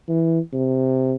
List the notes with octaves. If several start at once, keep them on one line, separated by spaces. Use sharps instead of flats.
E3
C3